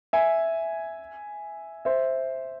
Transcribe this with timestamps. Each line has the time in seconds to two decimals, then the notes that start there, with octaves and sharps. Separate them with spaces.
0.13 E5 G#5
1.85 C5 E5